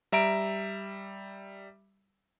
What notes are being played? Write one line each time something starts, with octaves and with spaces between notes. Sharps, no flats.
G3 E5 A#5 D7